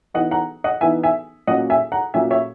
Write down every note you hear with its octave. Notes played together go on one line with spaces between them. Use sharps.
E3 B3 D#4 D#5 F#5
F#5 A#5
D#5 F#5
E3 B3 D#4 E5 G#5
E5 G#5
A#2 F#3 C#4 D#5 F#5
E5 G#5
F#5 A#5
A#2 F#3 C#4 E5 G#5
C#5 E5